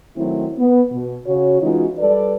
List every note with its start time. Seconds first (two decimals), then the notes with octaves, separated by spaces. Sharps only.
0.17 D#3 F#3 A3 C4 E4
0.58 B3
0.91 B2
1.26 C#3 F#4 C#5
1.62 E3 G#3 C#4 D#4 F4 F#4
1.98 G3 A4 B4 D5